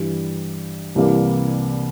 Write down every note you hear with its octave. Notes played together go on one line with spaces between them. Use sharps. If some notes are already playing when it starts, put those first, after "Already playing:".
Already playing: G2 E3 G3
C2 C3 E3 G3 A#3